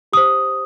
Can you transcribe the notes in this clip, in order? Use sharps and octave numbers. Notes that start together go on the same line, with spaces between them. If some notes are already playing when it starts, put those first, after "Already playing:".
G4 C5 D#6